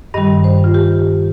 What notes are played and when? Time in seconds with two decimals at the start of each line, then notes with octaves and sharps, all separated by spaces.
0.14 G2 D#3 G3 D#5
0.44 C5
0.64 F4
0.74 G4